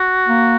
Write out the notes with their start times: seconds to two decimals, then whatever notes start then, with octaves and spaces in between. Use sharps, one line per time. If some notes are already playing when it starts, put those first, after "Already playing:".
Already playing: F#4
0.28 A#3